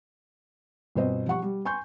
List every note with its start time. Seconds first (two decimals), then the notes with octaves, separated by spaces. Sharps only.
0.95 G1 B2 C4 C5 D#5
1.27 F3 G3 F#5 C#6
1.42 G3
1.65 G#5 C6 C#6 G6